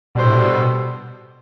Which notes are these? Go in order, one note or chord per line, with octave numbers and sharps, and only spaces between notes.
B2 G3 D4 A4 C5
A2
B2